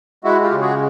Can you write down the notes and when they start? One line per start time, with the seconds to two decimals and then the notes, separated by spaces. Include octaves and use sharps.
0.24 G#3 E4 F#4
0.42 F4 G4
0.52 C#3
0.61 F#4 G#4